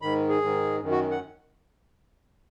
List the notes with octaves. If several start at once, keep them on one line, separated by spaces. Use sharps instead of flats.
G#2 D#3 B5
G#4
G#2 D#3
F#2 D#3
F#4
F#5